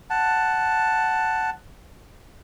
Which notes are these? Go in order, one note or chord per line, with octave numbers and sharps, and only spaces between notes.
F#5 A5